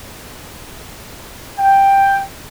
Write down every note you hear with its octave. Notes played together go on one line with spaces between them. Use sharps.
G5